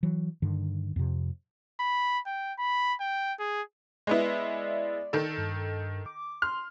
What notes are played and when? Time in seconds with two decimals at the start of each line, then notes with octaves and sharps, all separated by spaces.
0.03 E3 F#3
0.42 G2 D3 D#3
0.96 F2 C3
1.80 B5
2.26 G5
2.59 B5
3.00 G5
3.39 G#4
4.07 G#3 B3 E4 D5
5.13 D#3 A4
5.37 G2
6.06 D6
6.42 C6 F6